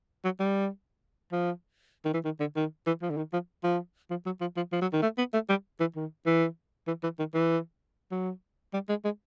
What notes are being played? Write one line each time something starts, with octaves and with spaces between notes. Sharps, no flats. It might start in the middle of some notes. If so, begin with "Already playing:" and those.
F#3
G3
F3
D#3
E3
D#3
D3
D#3
E3
F3
D3
D#3
F3
F3
F3
F#3
F3
F3
F3
F#3
D#3
A3
B3
A3
G3
E3
D#3
E3
E3
E3
D#3
E3
F#3
G3
G#3
G#3